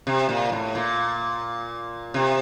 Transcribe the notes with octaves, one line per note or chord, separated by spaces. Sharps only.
C3
A#2
A2
A#2
C3